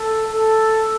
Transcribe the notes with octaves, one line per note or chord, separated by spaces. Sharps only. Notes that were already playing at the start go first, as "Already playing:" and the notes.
Already playing: A4
A4